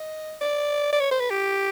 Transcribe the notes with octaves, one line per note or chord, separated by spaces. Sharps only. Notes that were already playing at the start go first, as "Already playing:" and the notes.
Already playing: D#5
D5
D5
C#5
C5
B4
G4